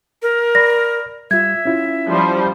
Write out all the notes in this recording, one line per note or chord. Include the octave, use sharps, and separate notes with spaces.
A#4
D5 B5 A#6
G3 F4 E5 G#6
C#4 E4 F4
F3 G3 C5